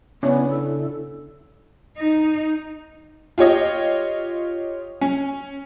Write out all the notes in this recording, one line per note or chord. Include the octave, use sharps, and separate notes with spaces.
C#3 B3 C#4 D4 E4
A4
D#4
F4 G4 C#5 D#5
C#4